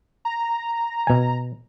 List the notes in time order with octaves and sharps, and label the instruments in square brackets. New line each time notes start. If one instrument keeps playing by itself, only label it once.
[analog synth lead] A#5
[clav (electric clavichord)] B2 G#5